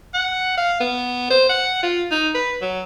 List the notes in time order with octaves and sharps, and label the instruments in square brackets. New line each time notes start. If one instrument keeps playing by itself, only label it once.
[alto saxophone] F#5
F5
B3
C5
F#5
F4
D#4
B4
F#3